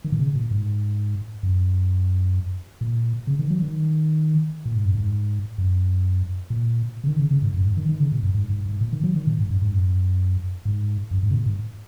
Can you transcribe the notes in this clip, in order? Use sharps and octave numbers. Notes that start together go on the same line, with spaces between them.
D#3
A#2
C#3
A#2
G#2
F#2
A#2
C#3
D#3
F#3
D#3
A#2
G#2
F#2
G#2
F#2
A#2
C#3
D#3
C#3
C#3
G#2
F#2
G#2
D#3
D#3
C#3
A#2
F#2
G#2
G#2
G#2
A#2
D#3
F#3
D#3
A#2
G#2
F#2
G#2
F#2
G#2
F#2
G#2
C#3
A#2
G#2